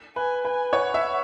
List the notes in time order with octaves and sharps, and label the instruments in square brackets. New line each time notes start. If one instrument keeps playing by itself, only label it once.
[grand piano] B4 [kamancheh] G#5
[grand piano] B4 [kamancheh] G#5
[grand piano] C#5 [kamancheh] F#5
[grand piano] E5